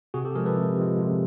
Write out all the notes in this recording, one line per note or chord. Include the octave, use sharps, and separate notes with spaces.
C3 F#4 G#4
G4 A4
F3 G#3 G#4 A#4
A4 B4
C3
F3 G#3
C3